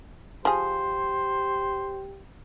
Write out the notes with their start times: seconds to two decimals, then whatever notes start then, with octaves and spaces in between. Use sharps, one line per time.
0.45 F3 G4 G#4 C5